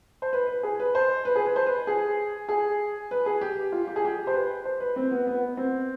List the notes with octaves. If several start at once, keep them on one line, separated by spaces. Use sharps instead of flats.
C5
B4
B4
G#4
B4
C5
B4
G#4
B4
C5
B4
G#4
G#4
B4
G#4
G4
F4
G4
G#4
G4
C5
B4
C5
B4
C4
B3
B3
C4